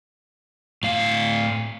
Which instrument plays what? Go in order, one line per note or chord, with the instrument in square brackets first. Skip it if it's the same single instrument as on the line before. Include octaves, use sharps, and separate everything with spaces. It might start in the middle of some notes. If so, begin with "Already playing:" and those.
[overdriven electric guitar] A2 F5